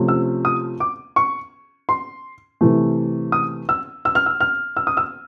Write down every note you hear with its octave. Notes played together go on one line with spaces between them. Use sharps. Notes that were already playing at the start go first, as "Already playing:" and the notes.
Already playing: C3 F3 A3 C#4
E6
D#6
D6
C#6
C6
C3 E3 A3
D#6
E6
E6
F6
E6
F6
E6
D#6
E6